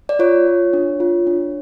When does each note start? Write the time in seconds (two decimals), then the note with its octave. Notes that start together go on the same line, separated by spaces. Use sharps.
0.09 D5
0.19 F4 C#5
0.46 F4
0.73 D4
1.00 F4
1.27 D4